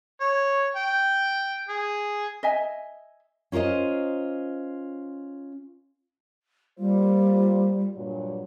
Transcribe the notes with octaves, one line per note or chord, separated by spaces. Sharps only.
C#5
G5
G#4
D#5 E5 G#5
C#4 F4 A#4 C5 D#5
G3 A#3 F4 C5
G2 A#2 F#3